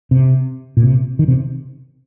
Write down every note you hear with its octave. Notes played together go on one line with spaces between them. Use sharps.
C3
A#2
C3
D#3
C3